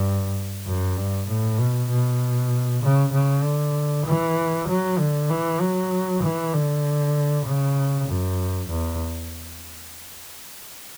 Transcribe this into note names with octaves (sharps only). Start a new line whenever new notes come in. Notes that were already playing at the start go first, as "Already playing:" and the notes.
Already playing: G2
F#2
G2
A2
B2
B2
C#3
C#3
D3
E3
F#3
D3
E3
F#3
E3
D3
C#3
F#2
E2